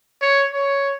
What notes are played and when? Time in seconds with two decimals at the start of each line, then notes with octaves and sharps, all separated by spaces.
0.22 C#5
0.51 C#5